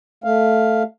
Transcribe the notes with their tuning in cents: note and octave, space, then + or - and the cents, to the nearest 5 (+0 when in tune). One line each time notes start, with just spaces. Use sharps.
A3 +0 F5 +0